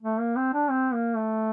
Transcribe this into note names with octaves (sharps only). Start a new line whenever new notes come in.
A3
A#3
C4
D4
C4
A#3
A3